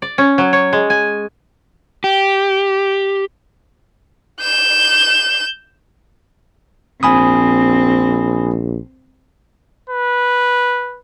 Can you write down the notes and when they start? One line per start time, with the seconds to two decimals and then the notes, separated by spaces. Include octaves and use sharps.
0.02 D5
0.18 C#4
0.38 F#3
0.53 C#5
0.73 G#3
0.90 G#5
2.04 G4
4.41 G6 E7
7.03 A#1 C4 G#5 B5 D#6
9.89 B4